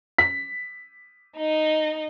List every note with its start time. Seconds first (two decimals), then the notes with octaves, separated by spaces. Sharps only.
0.18 B6
1.37 D#4 D#5